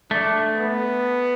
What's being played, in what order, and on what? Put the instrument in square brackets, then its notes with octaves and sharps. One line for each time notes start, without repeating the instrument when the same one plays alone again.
[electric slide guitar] A3 [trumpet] D4
[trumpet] B3